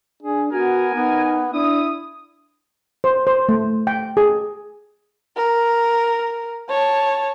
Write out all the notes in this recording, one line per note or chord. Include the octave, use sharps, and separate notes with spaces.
D4 G#4
B3 F#4 A#4 G#5
B3 D#4
D4 E4 D#6
C5
C5
A3
G5
G#4
A#4
C#5 A5